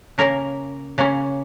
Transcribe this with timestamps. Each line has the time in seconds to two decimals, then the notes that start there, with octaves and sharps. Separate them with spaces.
0.18 C#3 A#3 C#4 A#4
0.98 C#3 A#3 C#4